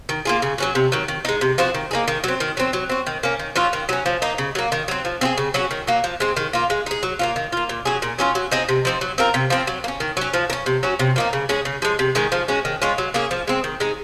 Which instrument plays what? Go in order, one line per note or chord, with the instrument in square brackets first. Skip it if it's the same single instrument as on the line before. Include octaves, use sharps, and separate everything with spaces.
[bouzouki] D#3
A#3 F4 G#4
C#3
F#3 C#4 F#4
C3
D#3 F#3
D#3
G#3 D#4
C3
F3 C4 F#4
D#3
A#3 D#4 G#4
D#3
F#3 C4
D#3
F#3 C4
F#3
C4 F#4
D#3
A#3 C#4
D#3
F#3 C#4 F4
D#3
F#3 C#4
F3
A#3 D#4
C#3
F#3 A#3
D#3
F#3 C4
F3
C4 F4 G#4
C#3
F#3 C#4 F#4
D#3
F#3 A#3
F3
G#3 C4
D#3
A#3 F4
G#3
D#4 G#4
F#3
A#3 C#4 F4
D#3
A#3 F4
A#2
F#3 C#4 G#4
A#2
F#3 C#4 F4
F#3
C4 D#4 G#4
C3
F3 C4 D#4
F#3
C4 F4 A#4
C3
F3 C4
F#3
A#3
C#4
D#3
F#3 C#4
F3
A#3
C#4
C3
F#3 C#4 F#4
C3
F3 A#3 D#4
C#3
G#3 C#4 G#4
C#3
F3 G#3
C3
D#3 G#3 C#4
F3
G#3 C#4 F#4
D#3
G#3 C#4 F4
F#3
A#3 C#4 G#4
F3
G#3 C4
D#3
G#3 D#4